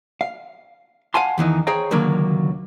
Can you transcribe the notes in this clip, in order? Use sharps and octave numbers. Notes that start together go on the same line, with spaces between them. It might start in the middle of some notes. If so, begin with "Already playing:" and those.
F5
F5 F#5 G#5 A5 C6
E2 D#3 E3 D#4
G#4 C5 C#5 F5 G5 A#5
C#2 D3 D#3 F#3 A#3